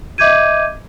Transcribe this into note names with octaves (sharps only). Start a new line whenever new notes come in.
D#5 E5 D6 G6 G#6 D#7